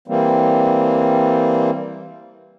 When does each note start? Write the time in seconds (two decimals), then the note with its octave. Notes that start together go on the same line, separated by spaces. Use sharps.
0.08 E3 G3 A#3 C4